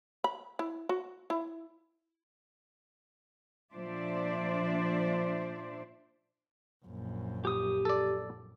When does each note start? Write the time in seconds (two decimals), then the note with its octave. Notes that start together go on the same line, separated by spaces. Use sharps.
0.24 B5
0.59 E4
0.89 F#4
1.30 E4
3.74 A#2 F3 D4 C5 D5 E5
6.85 A#1 F#2
7.45 G4 D#6
7.85 A4 D5